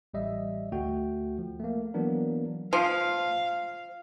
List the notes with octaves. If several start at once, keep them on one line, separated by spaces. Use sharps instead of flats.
A1 G3 D#5 E5
D2 A3 F#4 G5
F3
A3 A#3
E3 F#3 A#3 B3 D4 A#4
F3 F5